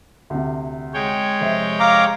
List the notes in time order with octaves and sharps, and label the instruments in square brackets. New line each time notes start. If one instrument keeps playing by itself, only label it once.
[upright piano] D2 C3
[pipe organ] G#3 C#5 G5
[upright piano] F1 C5 E5
[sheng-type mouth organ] F5 A#5 D6